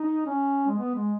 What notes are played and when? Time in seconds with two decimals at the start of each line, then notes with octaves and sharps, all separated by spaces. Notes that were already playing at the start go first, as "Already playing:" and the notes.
Already playing: D#4
0.26 C#4
0.67 G#3
0.78 B3
0.95 G#3